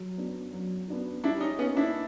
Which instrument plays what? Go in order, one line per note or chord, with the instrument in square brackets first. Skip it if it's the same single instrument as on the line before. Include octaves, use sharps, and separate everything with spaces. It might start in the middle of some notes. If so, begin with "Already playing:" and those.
Already playing: [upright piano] F#3
B3 D4 F#4
F#3
B3 D4 F#4
[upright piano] G3 [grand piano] D4 E4
[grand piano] C#4 D#4
[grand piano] B3 C#4 [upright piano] D#4
[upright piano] A#3
[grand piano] D4 E4